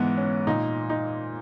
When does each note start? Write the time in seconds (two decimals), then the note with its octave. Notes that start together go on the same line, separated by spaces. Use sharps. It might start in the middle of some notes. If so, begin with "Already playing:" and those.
Already playing: G#2 E3 B3
0.18 C#4
0.47 A#2 D#4
0.90 D#4